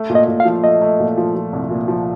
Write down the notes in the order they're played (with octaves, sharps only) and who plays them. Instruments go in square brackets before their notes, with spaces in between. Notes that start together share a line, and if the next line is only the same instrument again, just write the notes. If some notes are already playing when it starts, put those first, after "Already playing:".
Already playing: [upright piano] A3
A#2
[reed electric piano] D#5
[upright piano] A#2
[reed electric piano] F5
[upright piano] F3
[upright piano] A3 [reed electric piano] D#5
[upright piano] A3
A#2
F3
F3
C2
A#2
F3